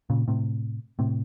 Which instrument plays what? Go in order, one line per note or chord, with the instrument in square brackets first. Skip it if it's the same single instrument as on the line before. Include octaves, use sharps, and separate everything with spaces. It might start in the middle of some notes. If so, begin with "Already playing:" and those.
[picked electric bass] A#2 C#3
A2 C3
A2 C3